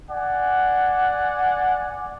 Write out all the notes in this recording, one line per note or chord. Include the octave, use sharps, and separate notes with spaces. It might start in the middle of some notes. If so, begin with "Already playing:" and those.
D5 F#5 G#5